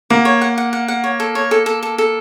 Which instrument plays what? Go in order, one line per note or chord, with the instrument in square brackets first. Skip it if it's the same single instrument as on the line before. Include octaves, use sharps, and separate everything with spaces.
[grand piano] A#3 [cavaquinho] F#5
[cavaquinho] C#5
F#5
F#5
F#5
F#5
C#5
A4
C#5
A4
A4
A4
A4